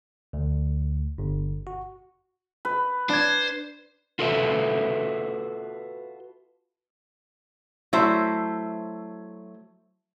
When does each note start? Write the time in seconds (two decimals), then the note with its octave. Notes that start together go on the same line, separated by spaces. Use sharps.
0.33 D2
1.18 G1
1.67 F#4
2.65 B4
3.09 D4 C5 G#6
4.19 F4 F#4 A4 B4 C#5 E5
7.93 F#3 A3 E4 C5 E5